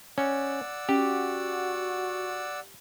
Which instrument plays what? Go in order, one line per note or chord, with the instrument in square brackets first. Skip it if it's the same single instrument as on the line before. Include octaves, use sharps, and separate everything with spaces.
[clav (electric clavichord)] C#4 [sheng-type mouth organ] D5 F#5 E6
[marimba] C#4 [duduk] F#4 [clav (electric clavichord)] G4